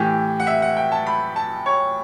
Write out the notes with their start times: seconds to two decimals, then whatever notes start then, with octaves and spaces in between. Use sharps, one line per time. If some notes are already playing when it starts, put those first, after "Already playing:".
Already playing: A2 E3 G4
0.40 F#5
0.47 E5
0.62 F#5
0.77 G5
0.92 A5
1.06 B5
1.36 A5
1.66 C#5